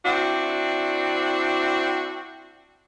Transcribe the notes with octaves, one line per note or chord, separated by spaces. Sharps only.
C4 D4 E4 F#4